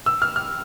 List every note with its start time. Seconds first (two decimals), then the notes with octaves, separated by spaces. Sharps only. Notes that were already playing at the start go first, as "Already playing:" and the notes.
0.06 E6
0.22 F6
0.36 F6